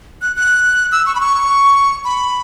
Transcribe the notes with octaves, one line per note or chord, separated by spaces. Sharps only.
F#6
F#6
E6
C#6
B5
C#6
B5